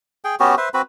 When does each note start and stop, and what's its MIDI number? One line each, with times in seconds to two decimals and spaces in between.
0.24 0.35 68
0.24 0.35 79
0.40 0.55 59
0.40 0.55 61
0.40 0.55 66
0.40 0.55 67
0.58 0.69 71
0.58 0.69 72
0.58 0.69 76
0.74 0.82 60
0.74 0.82 66
0.74 0.82 71
0.74 0.82 83